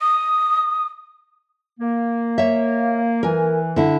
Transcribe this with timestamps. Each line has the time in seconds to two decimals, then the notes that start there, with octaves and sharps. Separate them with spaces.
0.01 D#6
1.79 A#3
2.38 C#5 E5
3.23 E3 A#4 G#5
3.76 D3 E4